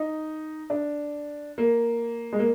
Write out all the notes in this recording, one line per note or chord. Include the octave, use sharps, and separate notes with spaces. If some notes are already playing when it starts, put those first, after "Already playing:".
Already playing: D#4
D4
A#3
G#3
A#3